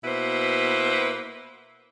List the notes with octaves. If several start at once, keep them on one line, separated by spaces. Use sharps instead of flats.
B2 A#3 E4 B4 C5